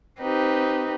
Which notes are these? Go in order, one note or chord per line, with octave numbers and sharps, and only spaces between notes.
C4 D#4 G4 B4